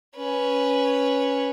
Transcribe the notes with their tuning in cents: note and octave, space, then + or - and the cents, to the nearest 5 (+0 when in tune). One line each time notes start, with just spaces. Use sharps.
C#4 +0 B4 -5